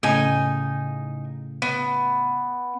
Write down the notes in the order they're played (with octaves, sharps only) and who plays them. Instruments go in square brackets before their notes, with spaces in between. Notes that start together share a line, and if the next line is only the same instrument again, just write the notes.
[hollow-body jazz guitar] A2 C#3 [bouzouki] D#4 G#5
[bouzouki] B3